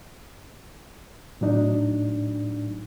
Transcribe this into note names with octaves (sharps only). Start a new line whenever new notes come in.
A2 F#3 D4 D#4